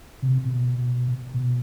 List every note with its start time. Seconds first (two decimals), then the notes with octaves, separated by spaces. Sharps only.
0.22 C3
0.45 B2
1.34 B2